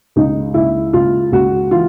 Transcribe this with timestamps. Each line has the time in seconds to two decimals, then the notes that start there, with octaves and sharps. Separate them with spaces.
0.16 C#2 D#4
0.54 C#2 E4
0.93 C#2 F4
1.32 C#2 F#4
1.71 E3 F4